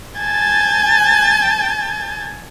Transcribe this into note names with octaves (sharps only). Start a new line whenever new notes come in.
G#5 A5 G6 A6